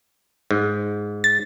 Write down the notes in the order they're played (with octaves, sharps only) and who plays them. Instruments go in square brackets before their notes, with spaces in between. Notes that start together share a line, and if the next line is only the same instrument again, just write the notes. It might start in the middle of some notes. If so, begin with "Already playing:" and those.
[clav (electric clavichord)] G#2
[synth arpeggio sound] A6